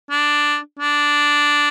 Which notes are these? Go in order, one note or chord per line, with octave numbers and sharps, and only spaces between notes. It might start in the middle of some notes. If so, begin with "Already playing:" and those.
D4
D4